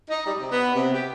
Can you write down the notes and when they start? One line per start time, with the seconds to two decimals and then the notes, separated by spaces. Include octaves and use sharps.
0.10 D#4
0.26 G3
0.39 C3
0.52 B3
0.76 C3
0.94 G4